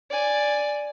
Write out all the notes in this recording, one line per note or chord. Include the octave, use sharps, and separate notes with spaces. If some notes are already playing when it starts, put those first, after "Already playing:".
D5 G#5